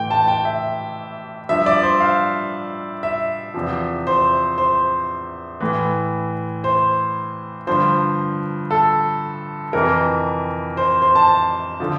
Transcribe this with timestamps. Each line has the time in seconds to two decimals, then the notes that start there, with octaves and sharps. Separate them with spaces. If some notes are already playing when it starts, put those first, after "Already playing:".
Already playing: A2 E3 G5
0.10 A5
0.28 G5
0.45 E5
1.49 G2 F3 E5
1.66 D5
1.83 C5
2.00 F5
3.03 E5
3.54 E2 C3 F3
4.07 C5
4.58 C5
5.60 A2 E3
6.64 C5
7.67 G2 D3 F3 C5
8.71 A4
9.73 F2 C3 E3 A#4
10.77 C5
11.02 C5
11.15 A5
11.80 D3 F3